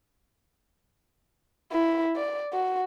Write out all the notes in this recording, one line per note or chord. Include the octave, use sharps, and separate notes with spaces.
E4
D5
F#4